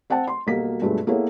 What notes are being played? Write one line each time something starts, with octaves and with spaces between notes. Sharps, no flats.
C4 F#5 G5 A5
C6
B1 F#3 G3 A#3 B6
G2 B2 G#3 A3 F4
A#3 B3 E4 G#4 A4 C#5